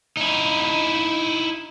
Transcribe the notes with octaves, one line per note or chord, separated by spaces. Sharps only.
D#4 E4